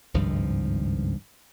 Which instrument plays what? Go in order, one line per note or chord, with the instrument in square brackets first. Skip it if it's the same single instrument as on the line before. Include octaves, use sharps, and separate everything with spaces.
[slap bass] G#1 C#2 G2 F3